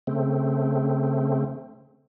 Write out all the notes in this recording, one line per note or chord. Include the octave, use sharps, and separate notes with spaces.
C#3 A3 C4